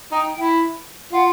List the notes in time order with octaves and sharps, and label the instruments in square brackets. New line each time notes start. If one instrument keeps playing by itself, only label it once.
[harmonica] D#4 [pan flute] G5
[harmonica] E4
[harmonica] F4 [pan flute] F#5